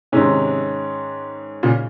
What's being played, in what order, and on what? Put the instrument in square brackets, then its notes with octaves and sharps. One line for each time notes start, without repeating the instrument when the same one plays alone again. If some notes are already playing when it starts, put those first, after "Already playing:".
[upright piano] G#2 D#3 G#3 C#4 [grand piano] C3
[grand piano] A#2 C#3